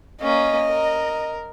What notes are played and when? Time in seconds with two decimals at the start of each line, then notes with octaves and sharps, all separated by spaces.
0.22 A#3 C#4 D#5
0.68 A#4